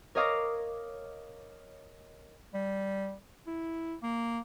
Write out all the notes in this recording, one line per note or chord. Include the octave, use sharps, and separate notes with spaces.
A#4 C#5 D#5 F5 D6 A#6
G3
E4
A#3